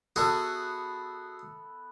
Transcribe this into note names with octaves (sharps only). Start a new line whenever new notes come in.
B3 F#4 G#4 A4 E5